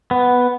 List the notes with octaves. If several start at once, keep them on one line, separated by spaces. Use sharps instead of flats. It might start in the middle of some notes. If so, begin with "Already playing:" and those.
B3